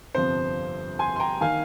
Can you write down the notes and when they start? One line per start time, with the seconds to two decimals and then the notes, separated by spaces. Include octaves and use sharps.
0.15 G1 F2 C3 F3 C5
0.99 G#5 C6
1.16 C6
1.20 G5 A#5
1.41 D#3 A#3 F5 G#5